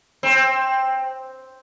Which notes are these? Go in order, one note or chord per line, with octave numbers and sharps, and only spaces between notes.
C4